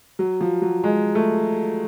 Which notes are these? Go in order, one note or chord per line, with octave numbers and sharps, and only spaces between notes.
F#3
F3
F#3
G#3
A3